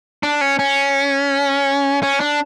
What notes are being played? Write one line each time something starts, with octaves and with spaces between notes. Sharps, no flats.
D4
C#4
C#4
C#4
D4